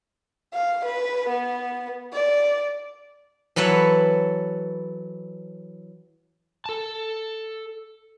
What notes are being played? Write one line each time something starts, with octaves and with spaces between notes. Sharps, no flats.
F5
B4
B3
D5
E3 F#3 A4 B4 C#5
A4 A5